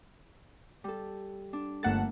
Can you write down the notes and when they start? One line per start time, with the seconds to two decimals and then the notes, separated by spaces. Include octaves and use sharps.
0.84 G3 A4
1.53 D4
1.83 G1 A3 A#3 F#5 A5